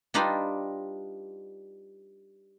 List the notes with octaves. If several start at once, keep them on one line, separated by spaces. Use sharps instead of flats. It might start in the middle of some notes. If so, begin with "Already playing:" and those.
G3 D4 D#4 F4 B4